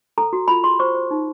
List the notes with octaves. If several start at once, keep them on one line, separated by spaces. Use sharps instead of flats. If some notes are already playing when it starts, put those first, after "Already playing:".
A4 A#5
F#4
F4 B5
G#4 C6
C5 C#6
C5
D#4